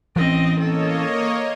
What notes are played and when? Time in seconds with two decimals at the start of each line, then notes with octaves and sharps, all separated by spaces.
0.16 E3 C4 C#4 D#5
0.60 A#3 A4 C#5 D#5